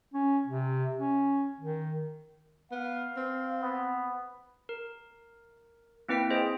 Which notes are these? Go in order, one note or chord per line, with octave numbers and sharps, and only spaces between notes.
C#4
C3
C#4
D#3
B3 F5
C4
B3
A#4
A#3 C4 E4 B4 G5 B6
G#4 C5 D#5